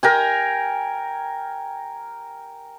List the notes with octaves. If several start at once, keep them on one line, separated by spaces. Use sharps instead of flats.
A#4 G5 G#5